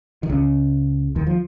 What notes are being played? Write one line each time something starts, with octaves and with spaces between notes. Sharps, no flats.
D#3
C#2 C#3
D#2 D#3
F3